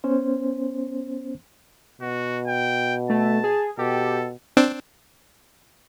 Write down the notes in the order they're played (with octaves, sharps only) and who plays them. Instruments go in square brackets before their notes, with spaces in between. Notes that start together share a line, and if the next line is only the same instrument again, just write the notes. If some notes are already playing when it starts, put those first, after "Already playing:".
[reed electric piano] B3 C#4 C5
[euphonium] B2 [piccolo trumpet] F#4
[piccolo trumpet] G5
[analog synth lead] A3 [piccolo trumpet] A5
[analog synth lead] G#4
[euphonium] B2 [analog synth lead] G4 [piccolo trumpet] A4
[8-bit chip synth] C4 D4